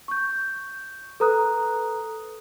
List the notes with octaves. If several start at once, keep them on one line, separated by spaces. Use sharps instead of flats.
C#6 G6
A4 B4 A#5 D#6 F#6